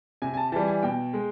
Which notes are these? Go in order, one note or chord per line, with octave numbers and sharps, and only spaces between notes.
C3 G#5
G#5
A5
E3 G3 A5
G#5
B2 G5
G#3